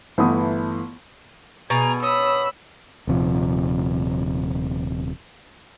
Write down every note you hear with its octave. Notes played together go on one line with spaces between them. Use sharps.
G1 E3 A3 E4 F#5 D#6
B2 G#4 G#5 A#5
C#5 B5 D#6 E6
D#1 C3 F3